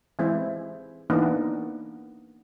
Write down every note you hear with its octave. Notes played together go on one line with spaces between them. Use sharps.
E3 G#3 C4 E4
E3 A#3 B3 D4 D#4